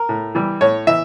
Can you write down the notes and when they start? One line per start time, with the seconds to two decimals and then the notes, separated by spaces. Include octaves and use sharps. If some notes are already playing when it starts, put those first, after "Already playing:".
Already playing: A#4
0.09 A2
0.35 E3 G3
0.61 A2 C#5
0.87 E3 E5